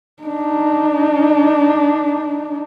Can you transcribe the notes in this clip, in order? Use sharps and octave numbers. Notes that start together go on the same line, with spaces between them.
D4 D#4